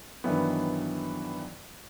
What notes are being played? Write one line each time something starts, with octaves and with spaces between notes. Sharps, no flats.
G2 D#3 E3 F#3 B3